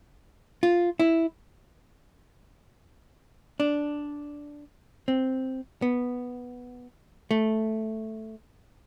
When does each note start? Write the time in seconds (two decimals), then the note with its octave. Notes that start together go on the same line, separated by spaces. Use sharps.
0.63 F4
1.00 E4
3.60 D4
5.08 C4
5.82 B3
7.31 A3